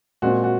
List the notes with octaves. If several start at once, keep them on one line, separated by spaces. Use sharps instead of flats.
A#2 G#3 C4 F#4
F#4